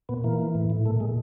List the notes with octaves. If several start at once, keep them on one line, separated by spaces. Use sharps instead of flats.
A#2 B3
E3 A#3
E3
A2
A2
A#2 A3
A#2 G#3